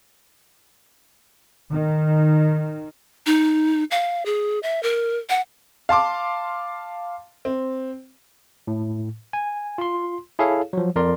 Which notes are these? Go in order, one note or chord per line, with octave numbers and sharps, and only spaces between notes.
D#3
D#4
F5
G#4
E5
A#4
F#5
F5 A5 C6 D6
C4
A2
G#5
F4 C6
E4 G#4 A4 C#5 F5
F3 F#3
F2 A#4 D5 C6